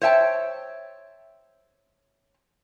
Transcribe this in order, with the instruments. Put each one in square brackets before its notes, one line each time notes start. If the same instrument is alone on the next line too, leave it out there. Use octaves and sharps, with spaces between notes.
[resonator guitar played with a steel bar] C5 C#5 E5 G5 A5